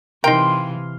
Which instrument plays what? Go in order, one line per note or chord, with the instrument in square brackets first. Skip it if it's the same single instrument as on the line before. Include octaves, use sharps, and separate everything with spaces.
[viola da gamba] C3 E3 [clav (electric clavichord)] D#4 A#4 [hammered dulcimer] F5 C6 [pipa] G5